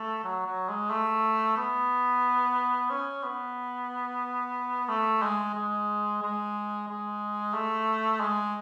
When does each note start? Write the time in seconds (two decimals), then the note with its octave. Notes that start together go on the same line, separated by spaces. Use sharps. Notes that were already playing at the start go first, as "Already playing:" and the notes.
Already playing: A3
0.24 F#3
0.46 F#3
0.69 G#3
0.91 A3
1.57 B3
2.91 C#4
3.24 B3
4.89 A3
5.22 G#3
5.55 G#3
6.22 G#3
6.88 G#3
7.54 A3
8.20 G#3